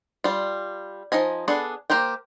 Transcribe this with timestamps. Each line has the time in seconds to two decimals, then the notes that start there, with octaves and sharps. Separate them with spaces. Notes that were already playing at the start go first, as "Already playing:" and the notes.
0.24 G3 F4
1.12 F3 D#4 D#5 G#5
1.48 B3 D4 G#4 A4
1.90 A#3 G4 A#4 C5 G5